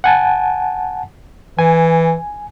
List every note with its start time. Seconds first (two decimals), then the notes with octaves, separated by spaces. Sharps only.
0.04 F#5 G#5 A5
1.59 E3 G#5